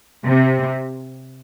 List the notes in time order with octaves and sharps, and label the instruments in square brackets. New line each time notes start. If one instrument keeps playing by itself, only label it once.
[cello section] C3